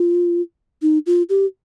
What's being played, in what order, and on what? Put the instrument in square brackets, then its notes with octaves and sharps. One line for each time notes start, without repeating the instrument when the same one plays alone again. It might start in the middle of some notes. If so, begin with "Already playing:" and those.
Already playing: [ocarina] F4
D#4
F4
G4